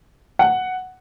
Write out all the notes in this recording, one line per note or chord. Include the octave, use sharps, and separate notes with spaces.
F#5